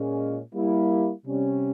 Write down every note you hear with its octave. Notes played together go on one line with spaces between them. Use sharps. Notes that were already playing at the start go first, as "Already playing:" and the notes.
Already playing: A#2 G#3 C#4
G3 A#3 E4
C3 G3 C#4